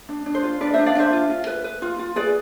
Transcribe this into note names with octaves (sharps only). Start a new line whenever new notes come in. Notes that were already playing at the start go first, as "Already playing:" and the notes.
D4
D4
C5
F4
D4 B4 D5
D4 C5 E5
D5 F5
D4 C5 E5
F4
F4
B4
B4
F4
F4
G#4 B4 D5